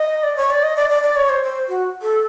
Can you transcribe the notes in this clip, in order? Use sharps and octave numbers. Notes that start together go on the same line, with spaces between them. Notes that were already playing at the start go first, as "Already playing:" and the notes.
Already playing: D#5
D5
C#5
D5
D#5
D5
D5
D5
C#5
C5
C5
F#4
A4